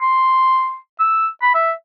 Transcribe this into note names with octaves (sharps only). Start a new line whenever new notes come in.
C6
E6
B5
E5